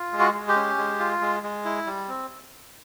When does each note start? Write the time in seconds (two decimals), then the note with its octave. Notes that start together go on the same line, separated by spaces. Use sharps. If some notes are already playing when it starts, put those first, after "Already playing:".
Already playing: F4
0.12 G#3
0.20 F#4
0.34 G#3
0.48 G4
0.56 C#4
0.78 G#3
0.99 F4
1.21 G#3
1.43 G#3
1.65 E4
1.86 G3
2.09 C4